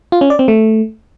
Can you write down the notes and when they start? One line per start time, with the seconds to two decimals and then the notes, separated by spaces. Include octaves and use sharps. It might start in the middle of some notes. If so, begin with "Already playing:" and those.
0.12 F4
0.21 C#4
0.30 D5
0.39 C4
0.48 A3